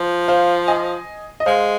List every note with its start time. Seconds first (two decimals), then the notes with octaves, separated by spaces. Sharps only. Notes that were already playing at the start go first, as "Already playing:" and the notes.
Already playing: F3
0.28 C5 F5
0.68 D#5 G#5
1.40 D#5
1.46 G#3 C5 F5